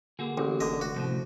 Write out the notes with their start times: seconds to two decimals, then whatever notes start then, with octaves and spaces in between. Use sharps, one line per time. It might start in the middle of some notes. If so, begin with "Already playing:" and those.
0.19 D3 A#3 F#4 G#4
0.38 A1 D3
0.60 F1 D3 D#5
0.81 D2 F#4
0.96 A2 C3 F3